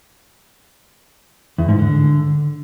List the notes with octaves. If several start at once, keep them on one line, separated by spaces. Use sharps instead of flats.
E2
G#2
D3